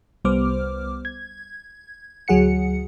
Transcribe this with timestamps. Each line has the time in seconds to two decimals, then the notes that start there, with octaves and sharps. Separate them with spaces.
0.25 C2 G3 B3 C5 D6 F6
1.05 G#6
2.28 D2 F#3 G#4 F#5 C#7